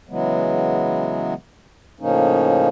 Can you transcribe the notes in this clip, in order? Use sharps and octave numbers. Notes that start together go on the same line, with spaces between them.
C#3 E3 F#3 G#3 B3
A2 C#3 F3 A#3 C#4 D#4